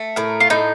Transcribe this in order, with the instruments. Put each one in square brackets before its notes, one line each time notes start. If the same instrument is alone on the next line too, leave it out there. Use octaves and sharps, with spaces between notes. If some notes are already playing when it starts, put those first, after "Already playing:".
Already playing: [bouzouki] A3
[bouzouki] A2 [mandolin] A#4
[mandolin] F4
[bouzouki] A2 [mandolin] D#4